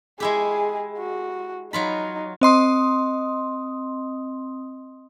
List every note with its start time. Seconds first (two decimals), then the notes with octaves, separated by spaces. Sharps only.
0.20 G#3 E4 G4 G#4
0.99 F#4
1.73 F#3 D#4 F4 B5
2.41 C4 D#5 C6 D#6